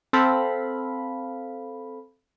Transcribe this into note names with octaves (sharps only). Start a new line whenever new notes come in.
C4 A4 F5 B5